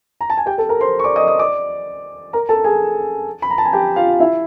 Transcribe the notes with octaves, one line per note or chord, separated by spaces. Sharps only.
A#5
A5
G#5
G4 G5
A4 A5
A#4 A#5
C5 C6
C#6
D5 D6
D#5 D#6
D#5 D#6
D5 D6
A#4 A#5
A4 A5
G#4 G#5
B5
A#5
A5
G#5
G4 G5
F4 F5
E4 E5